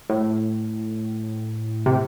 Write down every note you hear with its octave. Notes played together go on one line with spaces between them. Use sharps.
A2
C3